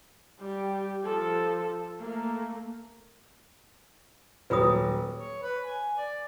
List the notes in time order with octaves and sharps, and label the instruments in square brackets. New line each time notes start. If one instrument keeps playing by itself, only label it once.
[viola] G3 G4
F3 A4
A3 A#3
[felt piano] D#1 F#3 [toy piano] B4 B5 D#6
[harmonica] C#5
B4
G#5
D5